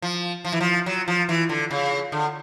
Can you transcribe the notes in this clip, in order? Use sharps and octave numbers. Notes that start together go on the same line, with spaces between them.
F3
F3
E3
F3
F#3
F3
E3
D3
C#3
D3